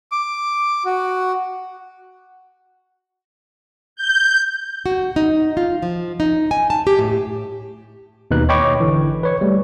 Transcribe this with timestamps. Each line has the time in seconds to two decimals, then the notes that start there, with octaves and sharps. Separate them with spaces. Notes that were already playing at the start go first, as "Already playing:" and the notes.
0.12 D6
0.85 F#4
3.96 G6
4.86 F#4
5.16 D#4
5.57 F4
5.83 F3
6.20 D#4
6.51 G#5
6.70 A5
6.87 G4
6.99 A2
8.31 D#2 B2 D#4 B4 F#6
8.49 C#5 D#5 G5 B5 C#6 D6
8.80 G#1 D3 E3
9.23 B4 C#5 C#6
9.41 G3 A3